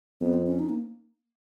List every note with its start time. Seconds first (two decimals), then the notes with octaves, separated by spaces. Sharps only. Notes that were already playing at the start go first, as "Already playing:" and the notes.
0.21 F2 B3
0.34 C4
0.47 C#4
0.59 D#4
0.69 A#3